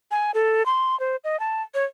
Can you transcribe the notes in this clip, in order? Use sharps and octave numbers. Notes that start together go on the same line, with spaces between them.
G#5
A4
C6
C5
D#5
A5
C#5